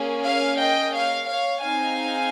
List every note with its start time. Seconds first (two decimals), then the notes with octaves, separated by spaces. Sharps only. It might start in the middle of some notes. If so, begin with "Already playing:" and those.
Already playing: A#3 C#4 G#4
0.25 C#5 F5
0.60 D#5 G5
0.94 C#5 F5
1.28 C#5 F5
1.63 C4 D#4 G#4 F5 G#5